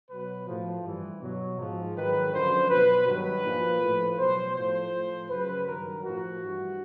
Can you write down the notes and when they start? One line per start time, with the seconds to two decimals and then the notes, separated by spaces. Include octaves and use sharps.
0.10 B2 F#3 B4
0.47 A2 F3
0.84 G2 E3
1.21 B2 F#3
1.58 G#2 F3
1.95 G#2 D#3 F#3 B4
2.32 F#2 D3 F3 C5
2.69 B2 F#3 B4
3.06 G2 D#3 F#3 B4
3.43 A#2 F3
3.81 A2 F3
4.18 B2 F#3 C5
4.55 A2 F3 C5
4.92 A2 F3
5.29 F#2 C#3 F#3 B4
5.66 G2 D#3 F#3 A#4
6.03 A2 F3 F#4
6.41 G2 E3